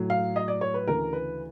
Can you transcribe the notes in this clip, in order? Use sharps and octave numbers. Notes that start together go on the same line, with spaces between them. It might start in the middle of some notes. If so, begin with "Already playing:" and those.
Already playing: A2 F#3
F5
D#5
D5
C#5
B4
D2 C#3 E3 A#4
B4